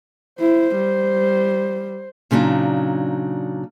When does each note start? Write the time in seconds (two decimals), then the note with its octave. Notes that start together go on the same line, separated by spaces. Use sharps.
0.40 E4 C5
0.75 G3
2.31 A#2 C#3 F#3 D4 D#4